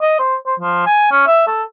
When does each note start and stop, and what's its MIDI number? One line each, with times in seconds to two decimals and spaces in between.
0.01 0.17 75
0.19 0.35 72
0.46 0.55 72
0.60 0.82 53
0.86 1.09 80
1.11 1.22 61
1.27 1.44 76
1.47 1.63 69